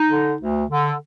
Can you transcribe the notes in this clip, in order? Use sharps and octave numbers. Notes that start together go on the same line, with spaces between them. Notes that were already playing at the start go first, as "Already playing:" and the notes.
Already playing: D#4
D3
D2
D3